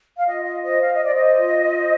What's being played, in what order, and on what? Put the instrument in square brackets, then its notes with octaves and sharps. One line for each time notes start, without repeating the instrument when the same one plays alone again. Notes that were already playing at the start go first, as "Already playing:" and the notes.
[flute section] F5
F4 D#5
D#5
C5 D#5
F5
D#5
C5 D5
D#5
F4
C5